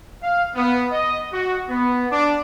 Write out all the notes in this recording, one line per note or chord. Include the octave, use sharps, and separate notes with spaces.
F5
B3
D#5
F#4
B3
D4